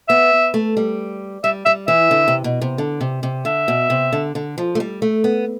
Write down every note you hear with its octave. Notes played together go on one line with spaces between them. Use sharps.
B3 E5
A3
G3
G3 E5
G3 E5
E3 E5
D3
C3
B2
C3
D3
C3
C3
D3 E5
B2
C3
D3
D3
F3
A3
G3
A3
B3